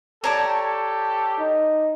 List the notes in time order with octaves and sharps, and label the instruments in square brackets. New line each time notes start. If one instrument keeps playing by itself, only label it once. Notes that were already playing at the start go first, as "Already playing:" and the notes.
[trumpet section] G4 A4 [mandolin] C#5 [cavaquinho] D5 A5 A#5
[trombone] D#4